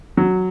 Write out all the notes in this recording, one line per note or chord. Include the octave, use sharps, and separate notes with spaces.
F#3